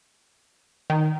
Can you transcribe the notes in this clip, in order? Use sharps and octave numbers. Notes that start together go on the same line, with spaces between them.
D#3